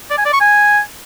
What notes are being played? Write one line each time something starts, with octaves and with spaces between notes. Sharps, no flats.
D5
G#5
D5
C#6
G#5